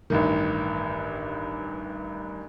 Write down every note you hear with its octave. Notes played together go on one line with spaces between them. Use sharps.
A1 G2 D#3